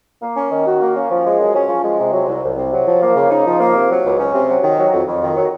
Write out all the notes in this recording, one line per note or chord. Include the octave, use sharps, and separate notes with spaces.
A#3
C#4
D#3
F#4
A#3
C#4
F3
G#3
F#2
C#4
F3
G#3
C3
F#3
C2
C2
C3
F#3
F3
A#3
C#3
D#4
F3
A#3
C3
F#3
C#2
C#4
C3
F#3
D#3
F#3
F2
F2
D#3
F#3